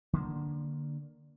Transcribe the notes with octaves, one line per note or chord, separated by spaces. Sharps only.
D3 A#3 C4 D4